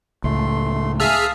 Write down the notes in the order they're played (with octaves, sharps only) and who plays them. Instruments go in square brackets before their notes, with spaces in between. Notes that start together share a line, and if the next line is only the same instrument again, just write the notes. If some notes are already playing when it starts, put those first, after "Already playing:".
[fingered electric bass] C#2 A2 [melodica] A3 C6
[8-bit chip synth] G#4 E5 F6 [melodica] F5 A5 D#6